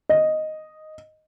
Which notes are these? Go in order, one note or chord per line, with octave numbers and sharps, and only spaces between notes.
D#5